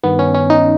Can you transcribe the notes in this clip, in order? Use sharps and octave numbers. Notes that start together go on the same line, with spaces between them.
G2 D#3 B3
C#4
C#4
D#4